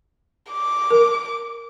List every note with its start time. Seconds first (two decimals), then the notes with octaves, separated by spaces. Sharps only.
0.52 D6
0.91 A#4